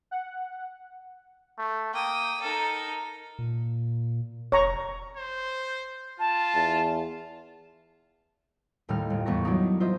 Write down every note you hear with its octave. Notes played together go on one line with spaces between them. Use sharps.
F#5
A3
A#3 G5 D#6
D#4 A4 A#4
A#2
F1 C#5 A#5 C#6
C5
F4 A5
E2
D#2 A2 G3 D#4 F6
G1
E2 A3 B3 C#6 A#6
F#3 D4 D#4
F4 C5 D#5 E5